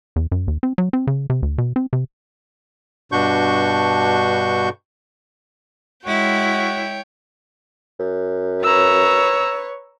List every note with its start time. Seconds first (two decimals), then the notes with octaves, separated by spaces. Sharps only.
0.16 E2
0.32 F#2
0.48 D#2
0.63 C4
0.78 F#3
0.93 C4
1.07 C#3
1.30 C3
1.42 D2
1.58 B2
1.76 C4
1.93 C3
3.12 G2 B2 D4 F#4 C#6 G6
6.06 G#3 E4 F#4 C#5 G5
7.99 F#2
8.63 B4 C#5 A#5 E6